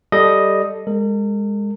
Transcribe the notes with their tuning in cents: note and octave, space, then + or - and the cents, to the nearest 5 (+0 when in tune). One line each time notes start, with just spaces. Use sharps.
G3 +0 A4 +0 D#5 +0
G#3 -15 A#4 -40